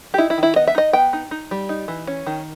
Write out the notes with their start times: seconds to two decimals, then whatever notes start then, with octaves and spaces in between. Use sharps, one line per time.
0.14 G4
0.18 D#4 E4
0.30 E4
0.38 D#3
0.43 E4
0.56 B3 D#5
0.67 E5
0.75 D#4 D#5
0.93 B3 G5
1.13 D#4
1.31 D#4
1.51 G3
1.69 D#4
1.88 E3
2.07 C#4
2.26 D#3